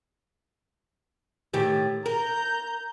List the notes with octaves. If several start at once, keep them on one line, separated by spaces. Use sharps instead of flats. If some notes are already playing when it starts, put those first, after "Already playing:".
A2 D#3 G4
A#4 A#5 G6